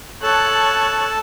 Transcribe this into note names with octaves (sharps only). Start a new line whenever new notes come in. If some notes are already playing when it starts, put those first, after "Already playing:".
A4 C#5 A5 F#6